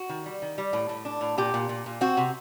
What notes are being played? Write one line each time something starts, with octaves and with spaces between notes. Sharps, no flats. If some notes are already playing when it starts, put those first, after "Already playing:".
Already playing: F#4
D#3
G3
D#3
G3
A2
A2
D4
A2
A#2 G4
A#2
A#2
A#2
C4 F#4
C3